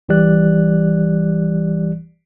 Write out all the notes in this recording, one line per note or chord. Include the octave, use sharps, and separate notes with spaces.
G#1 E3 G3 G4 D5 F#6